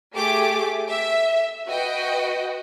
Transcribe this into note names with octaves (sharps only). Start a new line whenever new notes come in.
A3 G4 G#4 D6
E5
F#4 B4 D#5 G5